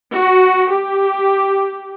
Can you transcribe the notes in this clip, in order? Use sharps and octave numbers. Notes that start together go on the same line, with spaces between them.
F#4
G4